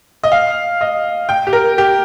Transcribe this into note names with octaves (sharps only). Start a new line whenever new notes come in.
D#5
F5
D#5
G5
G4
A#4
G4